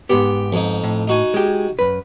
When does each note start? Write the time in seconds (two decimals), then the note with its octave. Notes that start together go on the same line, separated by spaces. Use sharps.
0.10 G#2 B3 G4
0.52 F2 D#4
0.84 A2
1.07 D#4 F#4 G#5
1.34 G#3 G4
1.79 F#2 B4